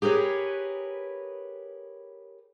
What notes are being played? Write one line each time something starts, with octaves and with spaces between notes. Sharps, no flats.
G4 G#4 A#4 B4 C#5